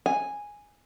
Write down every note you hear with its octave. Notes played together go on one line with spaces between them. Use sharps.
G#5